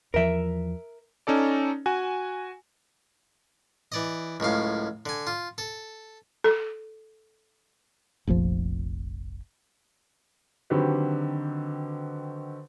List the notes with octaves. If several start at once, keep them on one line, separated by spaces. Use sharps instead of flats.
E2 F3 A#4 E5
C#4 D#4 A4 D5
F#4 G#5
E3 D5 D#5
C#2 F#2 A2 F5
D3 G#5
F4
A4
A4
F1 A#1 F2 F3
D3 D#3 F#3 C4 G4 B4